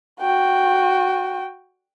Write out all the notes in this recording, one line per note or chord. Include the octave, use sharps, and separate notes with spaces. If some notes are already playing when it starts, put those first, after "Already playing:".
F#4 G5